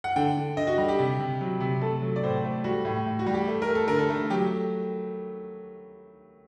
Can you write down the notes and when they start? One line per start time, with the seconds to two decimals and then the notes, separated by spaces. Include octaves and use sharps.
0.04 F#5
0.16 D3 G5
0.37 D3
0.57 D3 D#5
0.67 F#4
0.78 G3
0.88 G4
0.99 C3
1.20 C3
1.41 F#3
1.60 C3
1.82 A3 A4
2.02 F#3
2.16 D5
2.23 A2 C5
2.44 A3
2.64 G3 F#4
2.85 A2
3.06 A2
3.19 F#4
3.26 G3
3.34 G4
3.48 A3
3.62 A#4
3.69 A3
3.75 A4
3.88 D3 A#4
3.99 A4
4.10 A3
4.30 F#3 G4